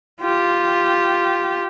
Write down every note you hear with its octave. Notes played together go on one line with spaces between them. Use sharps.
F4 G4